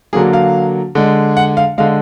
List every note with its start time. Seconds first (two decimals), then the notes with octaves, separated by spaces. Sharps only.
0.13 D3 F#3 A#3 G#4
0.33 F5
0.95 D3 G#3
1.37 F#5
1.57 F5
1.78 D3 G#3 F5